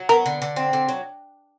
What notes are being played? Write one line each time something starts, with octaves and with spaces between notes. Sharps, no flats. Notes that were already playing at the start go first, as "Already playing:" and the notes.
Already playing: F#3
B3 A#4
D3
D3
C4
D3
F#3